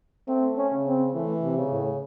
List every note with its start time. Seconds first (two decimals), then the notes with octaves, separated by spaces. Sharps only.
0.28 A3 C4
0.56 C#4
0.72 C#3
0.86 C4
1.14 E3 A3
1.43 C3
1.58 C#3
1.72 A2